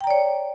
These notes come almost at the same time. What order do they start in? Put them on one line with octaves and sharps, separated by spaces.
G5 A#5 D5 C#5